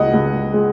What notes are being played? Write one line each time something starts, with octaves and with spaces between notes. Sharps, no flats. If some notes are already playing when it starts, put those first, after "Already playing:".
Already playing: C#2 D#5 F#5
C#2
G#3